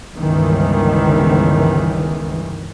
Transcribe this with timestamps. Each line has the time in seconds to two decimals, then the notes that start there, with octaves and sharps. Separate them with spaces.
0.17 G1 C#2 D#3 E3